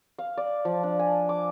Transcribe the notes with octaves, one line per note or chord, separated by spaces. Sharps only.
F5
D5
F3
D4
G#5
D6